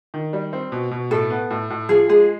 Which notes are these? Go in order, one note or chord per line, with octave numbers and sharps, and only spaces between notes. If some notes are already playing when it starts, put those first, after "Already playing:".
D#3
G3
C4
B2
B2
A2 A4
B3
A2
A2
F3 G#4
G#3 G#4